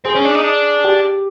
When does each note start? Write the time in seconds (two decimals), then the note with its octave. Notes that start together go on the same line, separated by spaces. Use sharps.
0.05 C4 G#4
0.15 C#4
0.25 D4
0.35 D#4
0.44 D4
0.84 G4